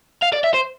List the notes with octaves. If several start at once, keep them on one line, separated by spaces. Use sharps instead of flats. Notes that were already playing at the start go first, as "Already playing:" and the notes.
F5
D5
E5
C5